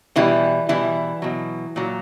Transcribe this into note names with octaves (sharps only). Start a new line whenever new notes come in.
B2 E3 G3 E4
B2 E3 G3 E4
B2 F#3
A#2 F#3